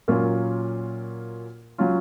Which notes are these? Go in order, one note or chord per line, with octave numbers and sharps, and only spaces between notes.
A#2 F#3 A#3 C#4 F4
F#3 C#4 F4